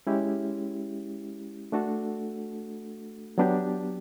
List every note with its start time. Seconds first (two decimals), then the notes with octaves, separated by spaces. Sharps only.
0.07 G#3 C#4 E4 G4
1.72 A3 D4 F#4 A4
3.38 F#3 B3 D4 G4